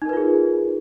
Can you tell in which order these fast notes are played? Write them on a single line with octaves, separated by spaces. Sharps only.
D#4 A#4 B4 F4 G#4